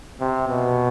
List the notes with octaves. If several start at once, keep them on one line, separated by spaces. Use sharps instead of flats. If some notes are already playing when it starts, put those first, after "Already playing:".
C3
B2